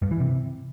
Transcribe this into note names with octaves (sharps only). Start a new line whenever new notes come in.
G2
E3
C3